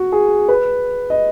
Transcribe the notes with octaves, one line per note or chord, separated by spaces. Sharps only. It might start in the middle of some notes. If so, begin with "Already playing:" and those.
Already playing: F#4
G#4
B4
D#5